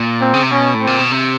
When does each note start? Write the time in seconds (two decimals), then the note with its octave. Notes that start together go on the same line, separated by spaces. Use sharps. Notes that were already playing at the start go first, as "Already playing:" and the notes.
Already playing: A#2
0.21 C4
0.34 C#3
0.42 C3
0.51 B2 C#4
0.74 A2
0.81 C4
0.87 A#2
0.99 B2
1.12 C3